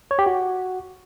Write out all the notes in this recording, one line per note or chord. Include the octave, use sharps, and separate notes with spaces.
C#5
G4
F#4